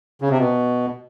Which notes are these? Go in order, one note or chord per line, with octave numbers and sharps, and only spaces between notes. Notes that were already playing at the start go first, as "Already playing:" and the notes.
C#3
C3
B2